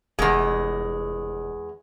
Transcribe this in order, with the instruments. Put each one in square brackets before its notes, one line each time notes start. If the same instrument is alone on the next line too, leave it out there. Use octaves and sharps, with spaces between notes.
[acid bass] F1 [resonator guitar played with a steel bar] E2 G#3